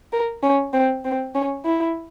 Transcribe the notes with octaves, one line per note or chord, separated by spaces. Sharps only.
A#4
C#4
C4
C4
C#4
E4